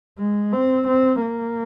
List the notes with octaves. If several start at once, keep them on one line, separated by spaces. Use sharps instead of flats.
G#3
C4
C4
A#3